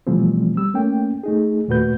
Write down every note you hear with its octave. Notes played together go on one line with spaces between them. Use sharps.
B2 E3 F3 G3 A3 C4
G3 E6
A3 A#3 C#4 G5
A3 D#4 G#4
D#2 A#2 A3 F#4 B4 G6